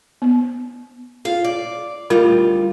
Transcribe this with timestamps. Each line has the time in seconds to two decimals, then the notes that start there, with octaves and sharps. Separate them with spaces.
0.22 B3
1.25 F4 F5
1.45 D5
2.10 D2 G3 F4 A#4